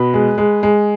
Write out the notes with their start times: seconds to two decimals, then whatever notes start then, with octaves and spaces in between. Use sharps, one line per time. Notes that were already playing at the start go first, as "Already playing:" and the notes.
Already playing: B2 B4
0.14 G#3
0.38 G#3
0.63 G#3